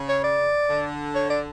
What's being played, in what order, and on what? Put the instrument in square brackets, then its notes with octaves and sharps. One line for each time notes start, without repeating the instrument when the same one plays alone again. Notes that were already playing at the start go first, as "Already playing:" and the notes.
Already playing: [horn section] C#3
[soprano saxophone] C#5
D5
[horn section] D3
[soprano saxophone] C#5
D5